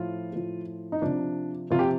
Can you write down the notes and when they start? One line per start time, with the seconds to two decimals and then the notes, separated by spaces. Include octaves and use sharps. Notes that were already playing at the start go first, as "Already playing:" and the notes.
Already playing: A2 F3 F4
0.32 A2 F3
0.92 D#4
1.02 C3 F3 D4
1.71 C3 F3 F4
1.79 G4